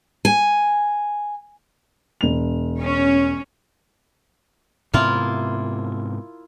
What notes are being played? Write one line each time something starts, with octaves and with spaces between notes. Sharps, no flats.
G#5
E1 F7
C#4
G#2 C3 A#3 B3 E4 F4